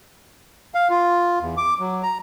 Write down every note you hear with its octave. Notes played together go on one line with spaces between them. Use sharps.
F5
F4
E2
D6
F#3
A#5